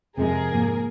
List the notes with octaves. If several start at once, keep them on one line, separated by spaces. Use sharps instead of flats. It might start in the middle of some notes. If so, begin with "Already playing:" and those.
F2 C3 F3 G#3 G#4 A#4
G#2 F3 A#3